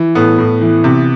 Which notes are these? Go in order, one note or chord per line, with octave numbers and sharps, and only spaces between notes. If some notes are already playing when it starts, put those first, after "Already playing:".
Already playing: E3
A2 B3
A2
E3
C3